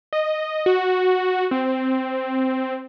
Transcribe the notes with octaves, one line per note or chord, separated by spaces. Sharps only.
D#5
F#4
C4